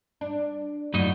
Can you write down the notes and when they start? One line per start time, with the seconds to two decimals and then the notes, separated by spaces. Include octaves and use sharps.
0.21 D4
0.94 F#2 A2 A#3 D4 D#4 F#4